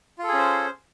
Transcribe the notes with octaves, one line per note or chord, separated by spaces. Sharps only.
C#4 F4 G#4 A4 C5